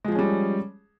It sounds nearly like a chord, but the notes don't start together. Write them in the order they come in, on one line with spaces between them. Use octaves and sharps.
G#3 F3 G#4 C#4 G3